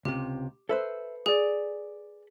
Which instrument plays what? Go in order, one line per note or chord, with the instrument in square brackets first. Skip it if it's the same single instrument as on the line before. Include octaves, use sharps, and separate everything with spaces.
[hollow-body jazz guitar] C#2 C3 [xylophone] G4
[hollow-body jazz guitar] A4 B4 C5 [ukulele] E5
[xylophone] G#4 [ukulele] D5 G#5